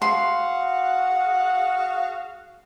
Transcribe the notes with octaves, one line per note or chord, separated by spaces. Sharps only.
F#4 G#4 F5 F#5 C6